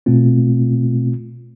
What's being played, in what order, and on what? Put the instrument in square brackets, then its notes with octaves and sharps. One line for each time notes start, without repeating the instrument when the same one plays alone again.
[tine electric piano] B2 A3 C4 F4